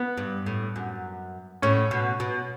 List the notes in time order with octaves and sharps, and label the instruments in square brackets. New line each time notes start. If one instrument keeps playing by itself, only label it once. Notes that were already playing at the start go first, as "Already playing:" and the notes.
Already playing: [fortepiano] B3
[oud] G2
A2
F#2
[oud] A2 [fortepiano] C#4
[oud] B2
B2